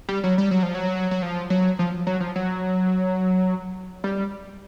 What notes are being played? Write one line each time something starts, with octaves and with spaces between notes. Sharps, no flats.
G3
F#3
G3
F#3
F3
F#3
F#3
F3
F#3
F3
F#3
F3
F#3
G3